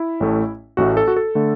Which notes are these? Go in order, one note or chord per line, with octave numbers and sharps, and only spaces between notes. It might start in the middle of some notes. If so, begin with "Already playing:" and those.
Already playing: E4
A1 A2 A3
A1 A2 A3 F#4
A4
F#4
A4
D3 A3